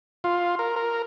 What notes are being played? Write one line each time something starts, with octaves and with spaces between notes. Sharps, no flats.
F4
A#4
A#4